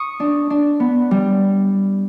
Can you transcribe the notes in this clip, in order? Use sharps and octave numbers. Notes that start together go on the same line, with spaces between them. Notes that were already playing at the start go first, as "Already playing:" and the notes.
Already playing: C#6 D#6
D4
D4
B3
G3